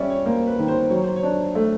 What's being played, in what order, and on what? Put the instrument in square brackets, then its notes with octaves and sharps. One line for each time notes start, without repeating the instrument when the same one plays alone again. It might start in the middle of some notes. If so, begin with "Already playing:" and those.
Already playing: [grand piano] G3 C#4 [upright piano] D5 E5
[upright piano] C#5
[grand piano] A#3 [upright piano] C5
[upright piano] B4
[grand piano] D#3
[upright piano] C5
[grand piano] F#3 [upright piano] C#5
[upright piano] C5
C#5
[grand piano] D4
A3